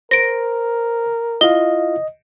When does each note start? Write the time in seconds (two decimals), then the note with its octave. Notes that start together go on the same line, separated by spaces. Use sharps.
0.11 A#4 C5 A#6 D7
1.41 E4 F4 D#5 F5 G7